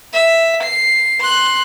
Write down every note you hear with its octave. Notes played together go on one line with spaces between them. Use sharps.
E5
C7
C6 F#6